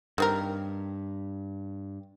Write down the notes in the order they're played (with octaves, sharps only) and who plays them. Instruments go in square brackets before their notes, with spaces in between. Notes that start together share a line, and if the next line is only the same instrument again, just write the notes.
[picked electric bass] G2 [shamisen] D#3 C4 A#4